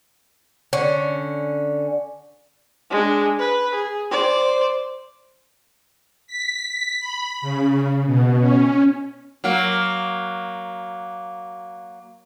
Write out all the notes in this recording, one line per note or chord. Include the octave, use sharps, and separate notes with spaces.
D3 C#4
G#3 D4
B4
G#4
C5 D5
B6
B5
C#3
B2
C#4
F#3 A#3